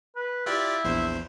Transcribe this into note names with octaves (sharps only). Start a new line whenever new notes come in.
B4
E4 F4 G4 D5
A#1 E2 C5